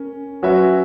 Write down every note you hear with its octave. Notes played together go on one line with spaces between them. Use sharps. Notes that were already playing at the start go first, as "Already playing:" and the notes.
Already playing: C#4 A#4
F#3 C#4 F#4 B4 E5